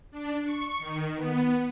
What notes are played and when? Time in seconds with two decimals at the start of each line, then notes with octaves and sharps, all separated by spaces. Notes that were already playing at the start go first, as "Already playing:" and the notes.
0.11 D4
0.44 C#6
0.79 D#3
1.16 B3